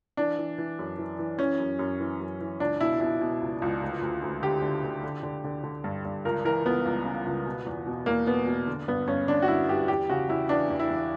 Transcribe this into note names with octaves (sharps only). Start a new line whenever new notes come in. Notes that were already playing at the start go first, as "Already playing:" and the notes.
E3 D4
E3
E3
F#2
E3
E3
E3 C#4
F#2
F#2
E3
F#2
E3
C#2 D4
B2 E4
B2 E4
B2
C#2
C#2
D2
D2
D2
D3 G4
D3
D3
D3
D3
D3
D3
G2
G2
C#2 A#4
E3 A#4
C#2 B3
C#2
C#3
C#2
B2
E2
B2
E2 A#3
B2 B3
B2
D3
G2 B3
G2 C#4
D3 D4
F#4
G2 E4
G2 G4
E2 G4
C#3 F#4
E2 E4
E3 D4
E2
E4
E2